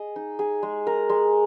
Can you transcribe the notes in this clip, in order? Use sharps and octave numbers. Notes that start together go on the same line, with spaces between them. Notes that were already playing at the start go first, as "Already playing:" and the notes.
Already playing: G#4 D#5
D#4
G#4
G#3
A#4
G#3